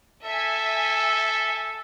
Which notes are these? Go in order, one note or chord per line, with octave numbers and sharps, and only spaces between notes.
A4 E5 G#5